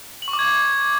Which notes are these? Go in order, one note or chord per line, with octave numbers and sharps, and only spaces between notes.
F#7
C#6
D6
G#6
D6